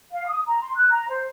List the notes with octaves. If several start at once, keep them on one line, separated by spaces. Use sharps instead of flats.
F5
D#6
A#5
C6
F#6
A#5
C5